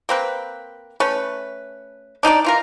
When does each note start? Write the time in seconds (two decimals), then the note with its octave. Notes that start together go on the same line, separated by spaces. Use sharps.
0.09 A#3 C4 B4
1.00 A3 C#4 B4
2.23 D4 D#4 G4 D5
2.45 E3 F4 A#4